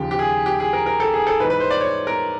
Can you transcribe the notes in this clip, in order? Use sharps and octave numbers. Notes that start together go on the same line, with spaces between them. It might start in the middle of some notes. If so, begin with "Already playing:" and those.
Already playing: D#2 C#3 F3 G4
G4
G#4
G4
G#4
A#4
A#4
A4
G#4
A4
G#2 E3 B4
B4
C5
D5
C#5
A#4